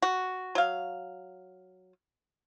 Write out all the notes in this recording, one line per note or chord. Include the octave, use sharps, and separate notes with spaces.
F#4
F#3 F5